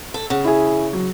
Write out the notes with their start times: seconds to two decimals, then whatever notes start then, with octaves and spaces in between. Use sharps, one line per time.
0.14 A4
0.30 C#3 F#5
0.44 E4 G#4
0.93 F#3